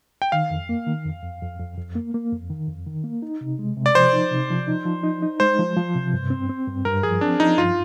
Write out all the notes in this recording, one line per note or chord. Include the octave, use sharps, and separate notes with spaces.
G5
D#3 F5
F2
A#3
D#3
F2
F2
F2
F2
F2
A#3
A#3
F2
D#3
F2
D#3
A#3
D#4
C3
G#3
C3
D5
F3 C5
D#4
C3
F3
D#4
F3
D#4
D#4
G#3 C5
F3
F3
C3
G2
C4
C4
G2
G2 A#4
F3 G#4
C4 D4
F3 D#4
G2 F4